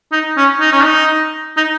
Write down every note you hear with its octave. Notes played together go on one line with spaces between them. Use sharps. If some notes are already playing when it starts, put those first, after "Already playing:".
D#4
C#4
D#4
C#4
D#4
D#4